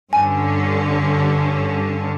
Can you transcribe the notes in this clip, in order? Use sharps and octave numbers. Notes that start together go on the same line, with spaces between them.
G2 D3 C#4 G#5